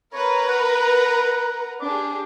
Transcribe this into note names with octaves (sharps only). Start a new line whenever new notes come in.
A#4 B4 C#5 A#5
F#5
D4 G4 G#4 D6